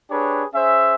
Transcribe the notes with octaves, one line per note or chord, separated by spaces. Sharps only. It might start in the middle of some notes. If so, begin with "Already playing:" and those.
D4 G4 G#4 B4 C#5
C#4 G#4 C5 E5